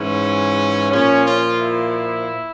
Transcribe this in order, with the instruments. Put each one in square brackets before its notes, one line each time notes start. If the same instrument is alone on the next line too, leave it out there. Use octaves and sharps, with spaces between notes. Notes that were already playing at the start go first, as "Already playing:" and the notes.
Already playing: [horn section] G#2 E3 C#4
A#2 F3 C#4
F4
E4